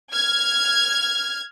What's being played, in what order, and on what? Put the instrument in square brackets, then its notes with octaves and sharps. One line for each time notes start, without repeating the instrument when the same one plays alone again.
[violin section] F6 G#6